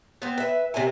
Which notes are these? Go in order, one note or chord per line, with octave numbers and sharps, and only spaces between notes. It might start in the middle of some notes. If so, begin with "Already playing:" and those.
B3 C4
B4 E5
C3 C4 A#4 G#5